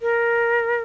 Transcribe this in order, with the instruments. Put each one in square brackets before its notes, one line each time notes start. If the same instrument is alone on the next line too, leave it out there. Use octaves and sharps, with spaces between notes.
[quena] A#4